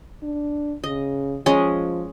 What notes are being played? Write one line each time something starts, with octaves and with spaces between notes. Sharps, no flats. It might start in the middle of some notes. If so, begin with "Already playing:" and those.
D4
C#3 D#5
F3 G#3 C#4 D#5